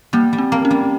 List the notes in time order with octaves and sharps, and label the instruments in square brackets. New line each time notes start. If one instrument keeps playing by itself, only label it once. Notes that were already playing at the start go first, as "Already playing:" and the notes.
[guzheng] G3 [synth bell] A#3
[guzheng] G3
[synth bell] C4
[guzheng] A#3
[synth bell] C#4
[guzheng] G3